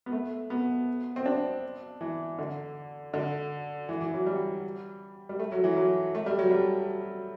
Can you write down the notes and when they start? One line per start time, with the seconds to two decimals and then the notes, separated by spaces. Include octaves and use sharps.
0.06 B3
0.12 A3
0.50 B3
1.16 C4
1.25 D4
2.01 E3
2.39 D3
3.14 D3
3.89 E3
4.01 E3
4.14 F#3
4.26 G3
5.29 G3
5.39 A3
5.52 F#3
5.64 E3
5.77 F#3
6.15 A3
6.26 G3
6.39 F#3
6.51 G3